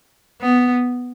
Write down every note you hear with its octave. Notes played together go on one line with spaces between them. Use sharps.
B3